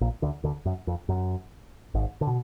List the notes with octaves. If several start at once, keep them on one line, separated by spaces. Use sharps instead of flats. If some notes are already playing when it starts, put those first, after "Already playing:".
A#1 A#2
D2 D3
D2 D3
F#2
F2
F#2
G#1 G#2
D3
B2